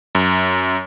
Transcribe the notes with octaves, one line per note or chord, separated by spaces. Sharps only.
F#2